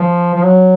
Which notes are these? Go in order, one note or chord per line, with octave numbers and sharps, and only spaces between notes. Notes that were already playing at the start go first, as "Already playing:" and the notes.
Already playing: F3
F3
F#3